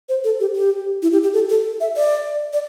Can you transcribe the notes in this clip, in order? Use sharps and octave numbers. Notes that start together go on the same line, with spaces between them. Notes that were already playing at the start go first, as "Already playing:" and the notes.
C5
A4
G4
G4
E4
G4
G4
A4
A4
E5
D5
D5